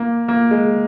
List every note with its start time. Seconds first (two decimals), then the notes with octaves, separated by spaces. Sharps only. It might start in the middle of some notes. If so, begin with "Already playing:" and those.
Already playing: A#3
0.28 A#3
0.51 G#3